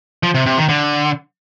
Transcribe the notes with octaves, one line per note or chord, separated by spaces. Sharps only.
F3
C3
C3
D#3
D3